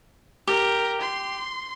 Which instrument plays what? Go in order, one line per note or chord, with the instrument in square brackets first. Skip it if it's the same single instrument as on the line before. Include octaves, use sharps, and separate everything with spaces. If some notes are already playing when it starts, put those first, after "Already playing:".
[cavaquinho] G4 [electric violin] A#4
[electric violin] C6